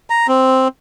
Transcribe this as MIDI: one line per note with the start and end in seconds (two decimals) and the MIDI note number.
0.10 0.27 82
0.28 0.68 60